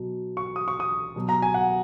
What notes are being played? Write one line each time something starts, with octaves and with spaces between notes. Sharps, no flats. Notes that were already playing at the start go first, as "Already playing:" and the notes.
Already playing: B2 F#3
C#6
D#6
C#6
D#6
B2 F#3
A#5
G#5
F#5